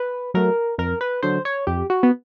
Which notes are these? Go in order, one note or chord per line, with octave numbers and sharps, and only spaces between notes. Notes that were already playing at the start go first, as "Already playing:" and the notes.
Already playing: B4
F#3 A3 A#4
F2 A#4
B4
D3 F#3 C5
C#5
F2 G4
F#4
B3